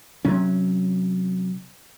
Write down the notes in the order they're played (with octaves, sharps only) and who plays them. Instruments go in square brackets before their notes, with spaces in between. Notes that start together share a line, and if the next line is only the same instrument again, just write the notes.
[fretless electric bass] C3 F#3 C#4